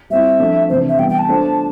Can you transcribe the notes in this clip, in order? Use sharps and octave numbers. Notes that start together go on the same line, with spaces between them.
G3 C4 E4 E5
F3 A3 D4
C3 E3 A3 D4 C5
E5
E3 G3 B3 G5
G5
A5
A3 D4 F4 C5